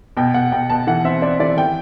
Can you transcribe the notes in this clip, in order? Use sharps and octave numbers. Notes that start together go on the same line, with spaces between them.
B2 G5
B2 F#5
B2 G5
B2 A5
E3 F#5
C4 E5
C4 D5
E3 D5
E3 G5